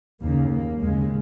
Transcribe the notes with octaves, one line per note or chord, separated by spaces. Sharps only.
D#2 C#3 A#3
A#3
D#2 C#3 G#3